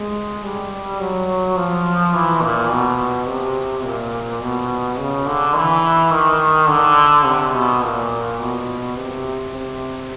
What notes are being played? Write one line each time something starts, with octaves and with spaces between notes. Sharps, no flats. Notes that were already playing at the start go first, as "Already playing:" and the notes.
Already playing: G#3
G3
F#3
F3
E3
A#2
B2
C3
A#2
B2
C#3
D3
E3
D#3
D3
C3
B2
A#2
B2
C3
C3